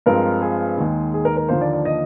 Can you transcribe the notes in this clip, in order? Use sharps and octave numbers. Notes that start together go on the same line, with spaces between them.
G2 F3 G#3 C4 A#4
G#4
D#2 D#3 G#3
G#4
A#4
A#4
D#2 D3 F3 A#3 C5
D5
D5
D#5